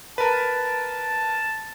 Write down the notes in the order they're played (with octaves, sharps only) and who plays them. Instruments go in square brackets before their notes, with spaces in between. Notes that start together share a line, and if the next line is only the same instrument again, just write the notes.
[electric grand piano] A#4 B4 [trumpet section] A5